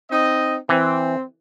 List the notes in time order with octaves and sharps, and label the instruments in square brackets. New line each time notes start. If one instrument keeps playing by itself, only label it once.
[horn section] C4 D#4 D#5
[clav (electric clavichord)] E3 [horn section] C4